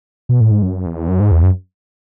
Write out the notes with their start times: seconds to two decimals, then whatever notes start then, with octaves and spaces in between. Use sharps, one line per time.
0.29 B2
0.41 A2
0.51 G#2
0.63 F#2
0.86 E2
1.08 F#2
1.20 G#2
1.31 E2
1.43 F#2